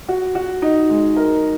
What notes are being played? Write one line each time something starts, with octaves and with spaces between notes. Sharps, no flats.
F#4
F#4
D#4
G#3
A#4